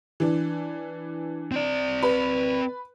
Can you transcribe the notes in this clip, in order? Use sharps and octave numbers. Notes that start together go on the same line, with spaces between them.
E3 D4
C4 D5
B4